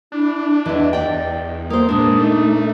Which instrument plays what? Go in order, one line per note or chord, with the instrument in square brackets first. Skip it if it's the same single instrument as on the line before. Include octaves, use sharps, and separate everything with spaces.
[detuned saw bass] D4 [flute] E4
[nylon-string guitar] E2 E3 [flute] D#5
[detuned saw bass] E2 [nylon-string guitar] D5 G5
[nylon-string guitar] A#3 C5 [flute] D#6
[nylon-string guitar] A#2 D4 [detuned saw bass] G#3 [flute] D#6
[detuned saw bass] A3 [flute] D#4